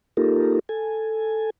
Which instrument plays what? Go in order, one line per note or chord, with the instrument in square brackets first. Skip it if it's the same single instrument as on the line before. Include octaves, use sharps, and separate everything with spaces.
[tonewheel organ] A#3 D#4 F4 G4 A4 A#4
A4 G#5